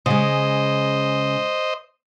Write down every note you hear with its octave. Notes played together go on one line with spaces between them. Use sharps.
C#3 G#3 C5 D#5